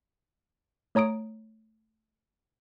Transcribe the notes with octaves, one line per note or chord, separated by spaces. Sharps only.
A3 C#5 A#5 D#6 D7